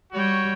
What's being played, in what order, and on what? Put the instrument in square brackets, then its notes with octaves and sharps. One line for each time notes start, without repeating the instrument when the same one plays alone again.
[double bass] G3 [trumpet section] F#4 C#5 G5